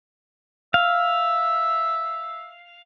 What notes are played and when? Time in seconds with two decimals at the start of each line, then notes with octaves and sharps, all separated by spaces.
0.74 E5 F5